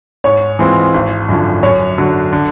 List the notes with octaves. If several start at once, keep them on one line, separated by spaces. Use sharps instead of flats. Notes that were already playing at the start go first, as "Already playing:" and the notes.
G#2 C#5
E3 G#3 C4 F4
G#1
F#2 D3 F3
F#2 C#5
D3 F#3
D3